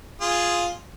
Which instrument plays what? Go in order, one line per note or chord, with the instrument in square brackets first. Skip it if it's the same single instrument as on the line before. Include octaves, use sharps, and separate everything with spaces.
[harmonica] F4 G#4